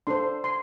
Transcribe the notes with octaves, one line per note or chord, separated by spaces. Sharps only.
D4 A4 C5 C6
C6